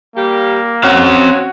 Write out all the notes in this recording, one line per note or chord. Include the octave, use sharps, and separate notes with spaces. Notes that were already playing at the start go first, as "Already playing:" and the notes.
G3 A#3 G4
F#3 C4 C#4 F#4 F5